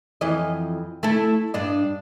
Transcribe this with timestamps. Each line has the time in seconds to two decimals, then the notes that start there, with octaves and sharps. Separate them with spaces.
0.21 F2 E3 D#5
1.03 A3 E4 A4
1.54 G2 D4 D#5